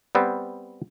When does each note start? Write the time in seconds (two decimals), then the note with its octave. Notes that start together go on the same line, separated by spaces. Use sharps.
0.15 G3 B3 C4